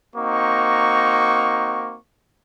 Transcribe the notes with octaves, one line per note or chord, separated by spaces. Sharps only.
A#3 C4 D#4 F#4 C#6